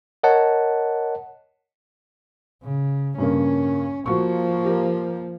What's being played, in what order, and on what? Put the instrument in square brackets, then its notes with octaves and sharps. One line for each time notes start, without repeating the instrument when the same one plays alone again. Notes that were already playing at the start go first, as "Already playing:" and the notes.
[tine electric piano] A#4 C#5 D#5 F#5 A5
[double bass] C#3
[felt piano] G2 C#3 A#3 [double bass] C#4
[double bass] F3 A#3 [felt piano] F#4 C#6
[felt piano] G4 A#4